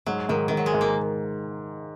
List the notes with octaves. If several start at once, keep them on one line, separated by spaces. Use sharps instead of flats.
G#2 F#3
G#2 D#3
G#2 D#3
F#3
G#3
G#2
A#3